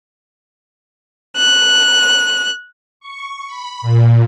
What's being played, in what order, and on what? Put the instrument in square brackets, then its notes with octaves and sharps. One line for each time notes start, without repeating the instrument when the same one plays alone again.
[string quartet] F#6
[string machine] C#6
B5
A#2